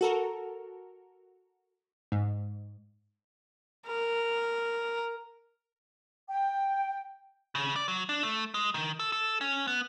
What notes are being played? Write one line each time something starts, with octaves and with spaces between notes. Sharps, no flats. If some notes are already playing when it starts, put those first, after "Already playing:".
F#4 A4 A#4
G#2
A#4
G5
C#3
D5
F#3
D4
A3
G#3
D#3
A4
A4
C#4
B3